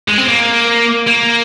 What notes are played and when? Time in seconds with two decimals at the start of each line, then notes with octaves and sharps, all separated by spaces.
0.08 G#3
0.18 C4
0.28 A#3
1.07 A#3